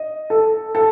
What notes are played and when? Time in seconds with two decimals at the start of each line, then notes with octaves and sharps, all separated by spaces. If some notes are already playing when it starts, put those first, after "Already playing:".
Already playing: D#5
0.30 A4
0.75 A4